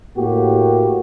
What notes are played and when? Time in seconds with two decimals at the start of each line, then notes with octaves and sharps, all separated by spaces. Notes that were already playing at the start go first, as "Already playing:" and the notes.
0.16 A2 A#3 F#4 G4